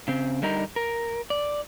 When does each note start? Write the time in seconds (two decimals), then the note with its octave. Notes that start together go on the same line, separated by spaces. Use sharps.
0.08 C#3 C4
0.42 D3 G3 D#4 A#4
0.76 A#4
1.30 D5